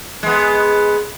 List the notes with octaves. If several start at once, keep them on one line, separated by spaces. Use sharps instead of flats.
G#3 B3